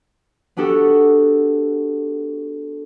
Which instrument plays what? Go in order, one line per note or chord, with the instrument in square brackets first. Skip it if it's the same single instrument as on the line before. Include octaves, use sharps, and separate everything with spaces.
[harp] B3 D4 F#4 G4 A4